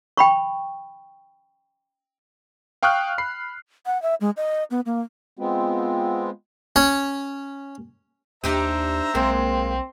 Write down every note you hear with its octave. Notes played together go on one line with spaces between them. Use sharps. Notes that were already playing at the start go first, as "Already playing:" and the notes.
G5 B5 C#6
F5 G5 C#6 D#6 F6 F#6
B5 C7
F#5
E5
G#3
D#5
B3
A#3
G#3 B3 C4 F4
C#4 C#5
D#2 D4 D#4 G4 C5 E5 A#5
B1 G#3 A#3 C4